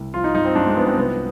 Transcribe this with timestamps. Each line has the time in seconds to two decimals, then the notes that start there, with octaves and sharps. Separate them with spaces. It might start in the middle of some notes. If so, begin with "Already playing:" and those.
Already playing: C2
0.14 F3 F4
0.24 D#4
0.35 G2 D#4
0.45 C4
0.55 G2 D4
0.66 G#3
0.76 F3 B3
0.87 C4
0.97 C2 B3